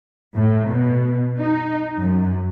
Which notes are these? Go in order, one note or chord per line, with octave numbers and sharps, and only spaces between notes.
A2
B2
D#4
F#2